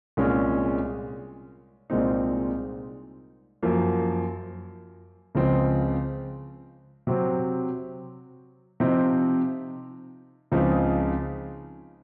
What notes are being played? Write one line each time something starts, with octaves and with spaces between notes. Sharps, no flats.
C2 A#2 G#3 C#4
C2 A#2 G#3 C4 D#4
F#2 F3 A#3
C#2 C#3 F3 C4
C3 F#3 C4
C3 F3 C4 D#4
C#2 C#3 F3 C4 D#4